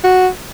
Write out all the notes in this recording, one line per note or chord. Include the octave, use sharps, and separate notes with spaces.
F#4